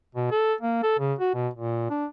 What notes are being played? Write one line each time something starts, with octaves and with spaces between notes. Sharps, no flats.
B2
A4
A#3
A4
C#3
F#4
B2
A#2
D4